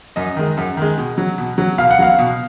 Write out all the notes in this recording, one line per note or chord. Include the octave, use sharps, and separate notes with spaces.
F#2 D#5
D#3 G#3
F#2
D#3 G#3
B2
F#3
B2
F#3
B2 F5
F#5
F#3 F5
B2